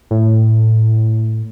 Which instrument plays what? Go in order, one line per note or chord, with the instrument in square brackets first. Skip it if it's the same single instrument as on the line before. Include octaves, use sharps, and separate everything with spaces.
[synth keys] A2